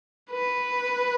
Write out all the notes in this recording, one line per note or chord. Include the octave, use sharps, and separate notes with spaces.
B4